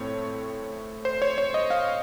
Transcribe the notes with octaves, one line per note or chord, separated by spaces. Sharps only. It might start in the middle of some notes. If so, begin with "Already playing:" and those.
Already playing: A2 A3 C4 C#5
C5
C#5
C#5
D#5
F5